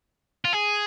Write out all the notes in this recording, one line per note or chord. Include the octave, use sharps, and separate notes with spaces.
F4
G#4